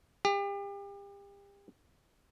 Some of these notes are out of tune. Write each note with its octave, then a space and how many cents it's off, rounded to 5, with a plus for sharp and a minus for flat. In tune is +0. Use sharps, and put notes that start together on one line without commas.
G4 +35